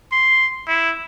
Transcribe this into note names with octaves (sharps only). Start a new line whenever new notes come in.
C6
E4